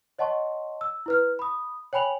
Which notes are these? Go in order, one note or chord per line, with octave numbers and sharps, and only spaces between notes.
C#5 D#5 F#5 A5 C6 C#6
E6
E4 B4 F6
B5 D#6
C#5 G5 G#5 B5 F7 F#7